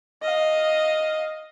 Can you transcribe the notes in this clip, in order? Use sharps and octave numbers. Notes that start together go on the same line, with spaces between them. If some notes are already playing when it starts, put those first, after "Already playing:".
D#5 F5